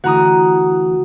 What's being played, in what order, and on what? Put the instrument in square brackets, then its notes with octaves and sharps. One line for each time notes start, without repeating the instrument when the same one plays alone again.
[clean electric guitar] D2 E3 [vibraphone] F#4 [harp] F#5 A#5 D#6